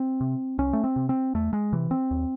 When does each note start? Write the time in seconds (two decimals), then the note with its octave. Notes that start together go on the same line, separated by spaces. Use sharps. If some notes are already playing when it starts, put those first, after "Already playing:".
Already playing: C4
0.21 C3
0.58 C2 C#4
0.73 A3
0.84 C4
0.96 C3
1.09 C4
1.34 E2 A3
1.53 G#3
1.73 C3 E3
1.91 C4
2.11 D#2